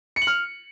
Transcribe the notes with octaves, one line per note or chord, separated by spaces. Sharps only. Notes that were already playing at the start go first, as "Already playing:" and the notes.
C#7
F#7
F6